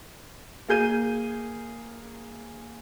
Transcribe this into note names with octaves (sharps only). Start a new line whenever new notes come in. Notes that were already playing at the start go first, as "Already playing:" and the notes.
A#3 G#4 G6 D#7